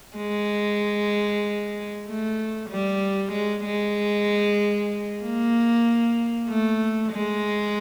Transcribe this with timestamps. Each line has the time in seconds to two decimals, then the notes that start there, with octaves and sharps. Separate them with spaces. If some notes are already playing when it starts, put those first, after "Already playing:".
0.17 G#3
2.06 A3
2.70 G3
3.32 G#3
3.65 G#3
5.23 A#3
6.49 A3
7.12 G#3